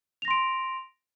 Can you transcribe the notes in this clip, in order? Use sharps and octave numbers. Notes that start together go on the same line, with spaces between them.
C6 A#6 D7 F7